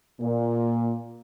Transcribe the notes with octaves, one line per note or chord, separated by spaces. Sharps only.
A#2